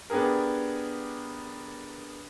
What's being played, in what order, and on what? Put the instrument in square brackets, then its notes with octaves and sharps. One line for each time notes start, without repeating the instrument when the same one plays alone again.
[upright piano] B3 D4 G4 G#4 A#4